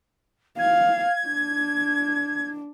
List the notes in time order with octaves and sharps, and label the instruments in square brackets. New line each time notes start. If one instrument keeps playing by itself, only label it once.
[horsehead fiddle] F5 [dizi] G#6
[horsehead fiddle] D4